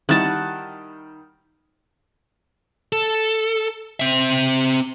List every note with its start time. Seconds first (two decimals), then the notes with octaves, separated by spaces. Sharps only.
0.09 D#3 G3 E4 F#5 A5
2.92 A4
4.00 C4 E5